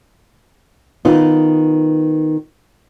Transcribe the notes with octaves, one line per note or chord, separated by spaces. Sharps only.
D#3 B3 D#4 F4